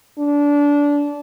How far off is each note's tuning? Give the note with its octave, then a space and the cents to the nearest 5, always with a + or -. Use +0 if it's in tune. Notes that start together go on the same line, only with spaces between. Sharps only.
D4 -20